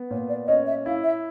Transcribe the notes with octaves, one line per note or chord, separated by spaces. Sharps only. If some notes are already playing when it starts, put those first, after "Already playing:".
Already playing: B3
A#2 C#5
D5
C#4 D#5
E5
E4 F5
E5